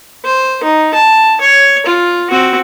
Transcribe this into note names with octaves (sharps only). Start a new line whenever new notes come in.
C5
D#4
A5
C#5
F4
C4 F#4